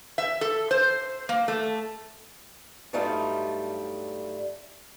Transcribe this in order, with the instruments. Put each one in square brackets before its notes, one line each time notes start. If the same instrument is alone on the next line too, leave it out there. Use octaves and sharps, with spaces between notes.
[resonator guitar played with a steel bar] E5
A4
C5
A#3
A3
[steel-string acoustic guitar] G2 F#3 G3 A3 D#4 F4